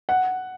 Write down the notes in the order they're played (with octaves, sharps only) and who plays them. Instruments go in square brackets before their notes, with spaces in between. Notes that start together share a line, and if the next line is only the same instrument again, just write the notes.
[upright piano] F#5